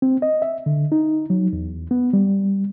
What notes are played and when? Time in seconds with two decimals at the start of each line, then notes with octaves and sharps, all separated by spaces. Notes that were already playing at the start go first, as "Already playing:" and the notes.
0.02 C4
0.22 D#5
0.42 E5
0.66 D3
0.92 D#4
1.30 F#3
1.53 E2
1.91 B3
2.13 G3